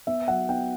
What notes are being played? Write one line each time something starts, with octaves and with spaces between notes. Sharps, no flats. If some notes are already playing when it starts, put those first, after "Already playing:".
B3 E5
F#3 F#5
B3 G5